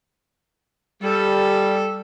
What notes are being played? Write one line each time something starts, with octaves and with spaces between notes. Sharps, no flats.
G3 A4